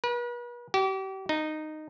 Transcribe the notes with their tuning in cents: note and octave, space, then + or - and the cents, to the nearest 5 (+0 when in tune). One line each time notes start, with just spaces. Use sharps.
B4 -40
G4 -35
D#4 -10